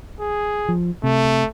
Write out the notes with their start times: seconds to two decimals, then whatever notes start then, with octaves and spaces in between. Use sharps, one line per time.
0.20 G#4
0.68 F3
1.03 C3 A3